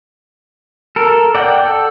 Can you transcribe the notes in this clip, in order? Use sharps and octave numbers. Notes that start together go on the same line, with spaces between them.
A4 A#4
D5 F#5 G5
A4